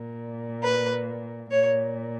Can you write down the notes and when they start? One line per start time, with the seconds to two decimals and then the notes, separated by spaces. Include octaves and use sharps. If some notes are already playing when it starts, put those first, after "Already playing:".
Already playing: A#2
0.63 B4
1.51 A#2 C#5